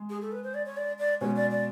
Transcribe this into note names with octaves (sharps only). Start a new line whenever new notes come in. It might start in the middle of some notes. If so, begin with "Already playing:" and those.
Already playing: G#3
G#4
A4
B4
C5
D5
C#5
D5
D5
B2 G#3 C#4 C#5
D5
D5